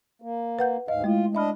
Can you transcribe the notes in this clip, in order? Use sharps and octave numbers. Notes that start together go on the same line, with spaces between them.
A#3
B4 F#5 G6
D2 G#2 D#5 F5
G#3 A3 E4 F4
D4 D#5 E5 B5 F6